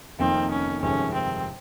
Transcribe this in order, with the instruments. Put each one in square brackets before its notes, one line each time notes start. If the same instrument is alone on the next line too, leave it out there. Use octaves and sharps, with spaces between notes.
[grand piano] F1 F2 D#3 A#3 D#4 [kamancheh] C4
[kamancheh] C#4
[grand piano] G1 F2 C3 D#3 G#3 [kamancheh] C#4
[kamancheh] C4